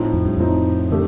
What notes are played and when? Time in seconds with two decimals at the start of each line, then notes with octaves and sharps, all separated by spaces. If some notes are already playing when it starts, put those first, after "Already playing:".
Already playing: A2 F3 C4 D#4
0.13 F2
0.25 G2
0.37 F2 A2 F3 C4 D#4
0.91 D#3 A3 D4 G4